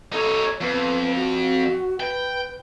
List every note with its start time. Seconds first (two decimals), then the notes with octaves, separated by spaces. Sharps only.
0.13 D#4 A4 C#5
0.61 F2 B3
1.15 F#4
2.00 B4 G5